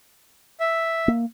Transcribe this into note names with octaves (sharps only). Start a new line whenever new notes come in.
E5
A#3